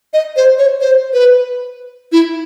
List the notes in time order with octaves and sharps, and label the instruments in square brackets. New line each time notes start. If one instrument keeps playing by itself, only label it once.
[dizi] D#5
C5
C#5
C5
B4
E4